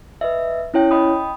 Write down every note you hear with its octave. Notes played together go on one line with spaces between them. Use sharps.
B4 D#5 E5
C#4 E4 C#5 G5
D#5 G5 B5 D#6